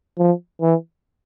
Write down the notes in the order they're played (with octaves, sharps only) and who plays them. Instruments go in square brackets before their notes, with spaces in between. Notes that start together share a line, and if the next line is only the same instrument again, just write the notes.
[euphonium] F3
E3